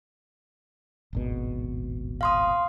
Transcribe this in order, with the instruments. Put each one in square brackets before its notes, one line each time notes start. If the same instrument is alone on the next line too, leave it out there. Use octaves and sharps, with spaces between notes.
[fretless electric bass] D1 G#1 B2
[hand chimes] F5 C6 D#6